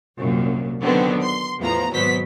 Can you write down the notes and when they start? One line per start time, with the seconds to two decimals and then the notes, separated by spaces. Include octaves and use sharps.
0.18 C2 F#2 A#2
0.82 D3 D#3 F#3 B3 C4
1.24 C6
1.60 E2 A2 F3 B3 A#5
1.93 G#1 B2 F#3 B3 C5 B6